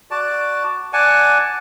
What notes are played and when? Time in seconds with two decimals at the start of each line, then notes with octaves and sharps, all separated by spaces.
0.11 F#4 D5 A5
0.93 D5 F#5 G#5 A5